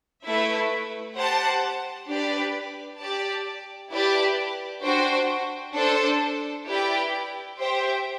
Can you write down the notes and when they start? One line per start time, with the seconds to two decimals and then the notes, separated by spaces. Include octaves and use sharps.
0.23 A3 E4 B4 E5
1.15 G4 C5 F#5 A5
2.06 D4 G4 B4 D5
2.98 G4 D5 A5
3.91 E4 G4 B4 D5 A5
4.82 D4 F#4 C5 G5
5.74 D4 A4 C5
6.66 E4 G4 B4 D5 G5
7.58 G4 C5 E5 G5